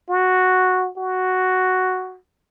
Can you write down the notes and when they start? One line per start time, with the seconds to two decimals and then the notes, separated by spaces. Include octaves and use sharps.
0.10 F#4
0.98 F#4